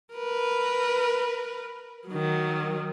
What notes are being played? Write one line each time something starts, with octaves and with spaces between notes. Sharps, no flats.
A#4 B4
D#3 F#3